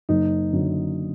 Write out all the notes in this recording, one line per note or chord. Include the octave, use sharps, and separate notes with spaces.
F#1 D#4
F#2 D3